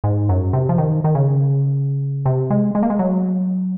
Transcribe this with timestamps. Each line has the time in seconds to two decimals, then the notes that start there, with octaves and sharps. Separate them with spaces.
0.04 G#2
0.29 F#2
0.53 C3
0.69 F3
0.78 D#3
1.04 D#3
1.15 C#3
2.26 C3
2.50 G#3
2.75 G#3
2.83 A#3
2.90 G#3
2.99 F#3